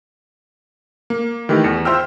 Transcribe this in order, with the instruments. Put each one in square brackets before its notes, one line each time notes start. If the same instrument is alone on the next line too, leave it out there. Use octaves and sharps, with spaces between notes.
[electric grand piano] A#3
D#3 E3 A3 G4
E2 C#7
F4 C5 E5 G5 E6 F6